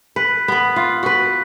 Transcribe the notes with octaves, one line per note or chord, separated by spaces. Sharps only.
B4
B3 B4
F4
F#4 B4